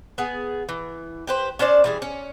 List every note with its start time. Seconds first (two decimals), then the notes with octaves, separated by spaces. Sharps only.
0.18 B3 G#4
0.69 E3
1.27 G4 B4 C5
1.59 C#4 D4 C5 D5
1.84 E3 G3 G#4
2.02 C#4